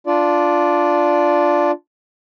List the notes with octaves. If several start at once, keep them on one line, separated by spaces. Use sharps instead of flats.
D4 F4 D5